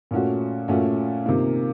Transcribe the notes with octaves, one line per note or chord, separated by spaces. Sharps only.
A#2 A3 C#4 F#4
A#2 A3 C#4 F#4
C3 D#3 A#3 F4